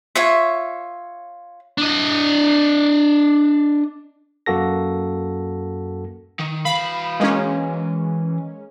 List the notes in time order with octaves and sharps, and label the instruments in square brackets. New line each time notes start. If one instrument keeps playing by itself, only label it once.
[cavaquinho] F4 C#5 E5
[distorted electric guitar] D4 D#5
[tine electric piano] F#2 A#3 F#4 A4 A#6
[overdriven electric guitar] D#3
[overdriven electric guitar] E3 F5 [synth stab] B5
[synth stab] G#3 A#3 C#4